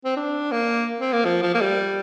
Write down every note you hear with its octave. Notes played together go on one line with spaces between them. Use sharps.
C4
D4
A#3
C4
A#3
F3
F3
A#3
G3